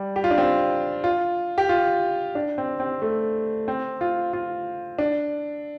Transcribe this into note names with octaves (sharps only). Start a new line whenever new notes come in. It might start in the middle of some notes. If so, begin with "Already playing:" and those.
Already playing: G3
G4
F4
D4
C4
F4
G4
F4
D4
C4
C4
A3
C4
F4
F4
D4